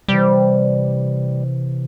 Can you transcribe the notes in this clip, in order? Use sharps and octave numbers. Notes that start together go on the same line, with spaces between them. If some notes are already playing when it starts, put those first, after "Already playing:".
C3 E3 G3